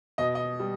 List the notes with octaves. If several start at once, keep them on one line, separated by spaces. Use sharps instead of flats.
B2 D#5
D#5
G3